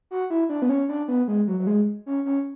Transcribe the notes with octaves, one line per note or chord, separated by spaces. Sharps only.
F#4
E4
D4
B3
C#4
D4
B3
G#3
F#3
F#3
G#3
C#4
C#4